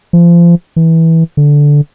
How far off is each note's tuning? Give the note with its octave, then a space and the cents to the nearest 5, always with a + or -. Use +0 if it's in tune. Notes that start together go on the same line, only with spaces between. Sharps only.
F3 -30
E3 -15
D3 -10